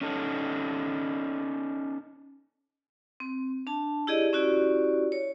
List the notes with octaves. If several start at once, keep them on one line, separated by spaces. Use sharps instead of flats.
C#4 D#4 A4
C4
D4 A5
E4 G4 G#4 D5 D#5
C#4 E4 F#4 G4 D5
C#5